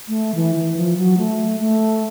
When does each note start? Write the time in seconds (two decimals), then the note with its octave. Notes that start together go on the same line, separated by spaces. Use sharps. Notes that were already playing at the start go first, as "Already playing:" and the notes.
0.08 A3
0.35 E3
0.55 E3
0.77 F3
0.97 F#3
1.18 A3
1.60 A3